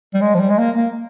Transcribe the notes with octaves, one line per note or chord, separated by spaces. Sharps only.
G3
G#3
F3
G3
G#3
A#3
A#3